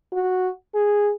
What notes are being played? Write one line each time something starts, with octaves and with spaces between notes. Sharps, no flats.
F#4
G#4